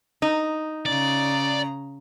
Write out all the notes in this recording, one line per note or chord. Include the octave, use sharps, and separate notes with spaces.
D#4
C#3 D5 A#5